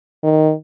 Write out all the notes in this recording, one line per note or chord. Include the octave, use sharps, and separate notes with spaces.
D#3